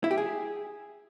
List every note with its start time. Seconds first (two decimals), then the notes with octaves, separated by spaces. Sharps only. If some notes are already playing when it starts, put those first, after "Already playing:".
0.04 E4
0.11 G4
0.18 G#4